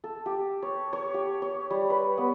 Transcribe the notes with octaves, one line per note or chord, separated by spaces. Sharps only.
A4
G4
C#5
C#5
G4
C#5
G3
B4
B3